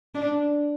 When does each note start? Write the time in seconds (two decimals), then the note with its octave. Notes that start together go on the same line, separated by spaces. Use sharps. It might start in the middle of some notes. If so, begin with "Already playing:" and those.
0.15 D4